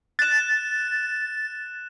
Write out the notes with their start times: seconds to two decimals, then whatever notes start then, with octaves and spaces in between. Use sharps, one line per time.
0.19 F#6 A6 E7